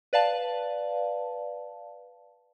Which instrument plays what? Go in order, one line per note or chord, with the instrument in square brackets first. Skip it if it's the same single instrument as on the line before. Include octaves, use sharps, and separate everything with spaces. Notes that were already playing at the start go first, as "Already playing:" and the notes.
[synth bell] B4 D5 F5 A5